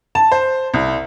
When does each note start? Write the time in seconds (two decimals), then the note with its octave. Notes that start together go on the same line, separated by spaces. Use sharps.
0.15 A5
0.32 C5
0.74 C2